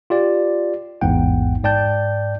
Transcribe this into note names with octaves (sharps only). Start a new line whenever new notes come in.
F4 G4 D5
A1 E2 G#2 F#5 G5
G#2 D5 G5 A5 G6